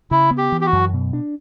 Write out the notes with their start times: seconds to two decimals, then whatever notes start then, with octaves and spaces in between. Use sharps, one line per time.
0.11 C#3 E4
0.31 B3
0.38 G4
0.52 E3
0.61 G4
0.66 F#4
0.73 F#2
0.93 B2
1.13 D4